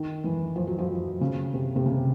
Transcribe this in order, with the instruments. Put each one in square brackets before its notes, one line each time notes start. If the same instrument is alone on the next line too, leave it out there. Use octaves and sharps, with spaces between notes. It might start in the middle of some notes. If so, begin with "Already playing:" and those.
Already playing: [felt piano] D#3
E3
F3
F#3
F3
C#3
C3
C3
C#3